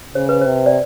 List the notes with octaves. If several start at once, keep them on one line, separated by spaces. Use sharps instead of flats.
C#3 C5
B4
C3 C5
D5